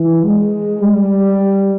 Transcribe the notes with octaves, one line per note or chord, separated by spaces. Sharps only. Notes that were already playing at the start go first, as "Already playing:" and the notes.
Already playing: E3
G#3
G3